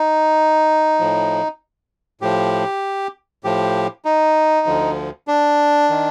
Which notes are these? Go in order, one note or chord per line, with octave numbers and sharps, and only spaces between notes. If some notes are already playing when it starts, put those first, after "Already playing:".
Already playing: D#4
A2 F3
A2 F3 G4
A2 F3 G4
D#4
D2 D3 F3
D4
D#3